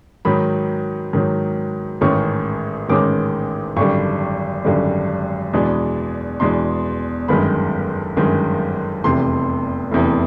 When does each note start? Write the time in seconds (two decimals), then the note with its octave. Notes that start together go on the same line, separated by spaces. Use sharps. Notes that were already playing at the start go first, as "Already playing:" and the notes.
0.25 G#2 D#3 F#3 B5
1.13 G#2 D#3 F#3
2.01 A1 G#2 D#3 G#3 C#4 C#6
2.89 A1 G#2 D#3 G#3 C#4 D6
3.77 G#1 F#2 D3 G3 C#6
4.65 G#1 F#2 D3 G3
5.53 E2 B2 G#3 B3 D4
6.40 E2 B2 G#3 B3 D4 C6
7.28 G1 F#2 D#3 G#3 B5
8.16 G1 F#2 D#3 G#3
9.04 F1 E2 C3 C6
9.91 F1 E2 C3